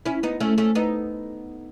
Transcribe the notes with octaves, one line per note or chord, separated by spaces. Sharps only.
C#4 E4
B3 D#4
A3 C#4
A3 C#4
B3 D#4